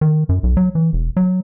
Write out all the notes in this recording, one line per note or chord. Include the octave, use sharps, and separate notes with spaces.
D#3
F#2
B1
F#3
E3
E1
F#3